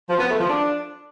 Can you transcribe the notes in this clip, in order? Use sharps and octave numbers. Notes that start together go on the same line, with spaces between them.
F3
B3
A3
F3
D4